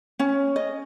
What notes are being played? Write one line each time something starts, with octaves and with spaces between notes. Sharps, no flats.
C#4
D#5